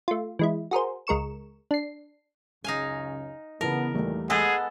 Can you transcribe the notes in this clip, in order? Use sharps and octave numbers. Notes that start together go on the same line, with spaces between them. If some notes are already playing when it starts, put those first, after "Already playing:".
A3 F4
E3 G#3 E4
F#4 G#4 A#4 C5
C#2 G#3 A#4 C#6 E7
D4 C7
C#2 F#2 C#3 D#4 F5 G#5
C#3 E3 B3 A#4 A5
E2 A#2 D#3 G3 A3
G#3 B3 G#4 A4 F#5